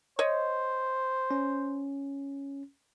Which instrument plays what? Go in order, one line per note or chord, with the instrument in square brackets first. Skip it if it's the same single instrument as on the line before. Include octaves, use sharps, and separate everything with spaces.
[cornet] C5 [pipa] C#5 D#5
[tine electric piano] C#4